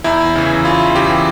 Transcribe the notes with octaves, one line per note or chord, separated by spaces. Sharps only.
E2 E4
C#3 E3
E2 F4
C#3 E3 G4